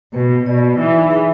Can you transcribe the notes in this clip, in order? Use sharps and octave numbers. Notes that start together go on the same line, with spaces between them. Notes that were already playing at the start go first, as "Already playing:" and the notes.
B2 B4
B2 D5
E3 D#4
G#4